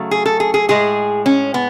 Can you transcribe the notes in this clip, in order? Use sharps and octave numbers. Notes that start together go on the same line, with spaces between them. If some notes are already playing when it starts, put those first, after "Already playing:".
Already playing: C#3 F#3 A3
G#4
A4
G#4
G#4
A2 G#3 G#4
C#4
B3